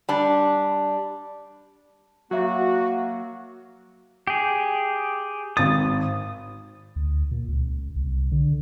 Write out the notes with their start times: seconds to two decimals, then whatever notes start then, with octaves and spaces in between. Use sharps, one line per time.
0.09 G3 D4
2.31 F#3 A#3 F#4 C#5 E5 A#5
4.27 G4 G#4
5.57 G#1 D#6 A6
6.96 D2
7.31 A#2
7.48 C#2
7.96 C2
8.32 D3